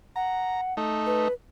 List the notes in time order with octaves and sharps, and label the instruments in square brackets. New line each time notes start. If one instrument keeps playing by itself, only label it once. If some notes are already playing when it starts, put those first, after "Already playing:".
[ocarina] F#5 [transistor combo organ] A#5
[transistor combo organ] A3 D#4
[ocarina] B4